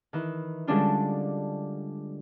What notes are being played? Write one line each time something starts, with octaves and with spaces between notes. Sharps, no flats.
D#3 E3
D3 G3 G#3 C#4 D4 F4